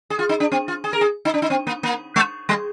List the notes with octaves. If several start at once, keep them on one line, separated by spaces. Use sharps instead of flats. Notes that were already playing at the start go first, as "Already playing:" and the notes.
G#4
F4
D#4
D4
C4
F4
G#4
A#4
G#4
D#4
D4
D#4
C4
A#3
A#3
G#3
G3